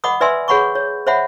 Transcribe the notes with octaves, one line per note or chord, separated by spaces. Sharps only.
D#5 F#5 B5 D6 D#6
B4 D5 E5 G#5 C6 E6
G#4 C#5 F#5 B5 C#6 D6
C#5
C5 C#5 E5 F#5 B5